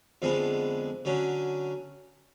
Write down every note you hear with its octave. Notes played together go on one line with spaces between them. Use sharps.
F2 D3 F3 G#3 B3
D3 F#3 C#4